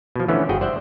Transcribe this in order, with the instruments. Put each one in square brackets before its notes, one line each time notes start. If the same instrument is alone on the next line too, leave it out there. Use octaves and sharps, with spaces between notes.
[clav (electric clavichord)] B2 F3
D3 E3 F3 A3 B3 C#4
G1 F#4 G#4 G5
C5 D5 E5 F#5 G5